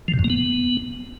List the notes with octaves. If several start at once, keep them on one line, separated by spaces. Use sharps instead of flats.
F3
C3
F#2
A#3
B3